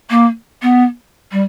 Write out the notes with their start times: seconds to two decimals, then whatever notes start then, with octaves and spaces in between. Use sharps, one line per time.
0.10 A#3
0.62 B3
1.32 G3